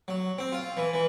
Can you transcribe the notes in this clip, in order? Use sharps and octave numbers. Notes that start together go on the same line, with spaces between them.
F#3
C4
F4
E3
E3